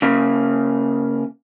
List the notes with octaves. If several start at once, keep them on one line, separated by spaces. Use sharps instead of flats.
C#3 A#3